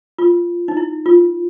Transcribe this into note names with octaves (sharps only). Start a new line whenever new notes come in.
F4
D#4
E4
F4